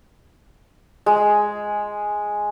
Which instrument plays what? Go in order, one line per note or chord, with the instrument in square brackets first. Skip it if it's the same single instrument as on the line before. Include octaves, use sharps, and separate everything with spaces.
[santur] G#3